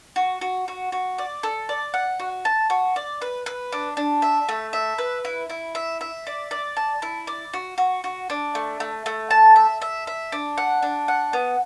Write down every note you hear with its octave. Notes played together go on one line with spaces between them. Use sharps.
F#4
F#4
F#4
F#4
D5
A4
D5
F#5
F#4
A5
F#4
D5
B4
B4
D4
D4
E5
A3
E5
B4
E4
E4
E5
E5
D5
D5
A5
E4
D5
F#4
F#4
F#4
D4
A3
A3
A3
A5
E5
E5
E5
D4
F#5
D4
F#5
B3